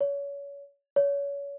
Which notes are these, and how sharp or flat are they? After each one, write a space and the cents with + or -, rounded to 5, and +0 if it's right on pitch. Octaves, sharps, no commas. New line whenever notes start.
C#5 +30
C#5 +30